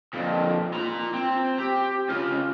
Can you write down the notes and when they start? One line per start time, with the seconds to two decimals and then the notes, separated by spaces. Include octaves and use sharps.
0.13 F2 A#2
0.74 F4 A#5
1.14 C4
1.58 G4
2.09 C#3 F4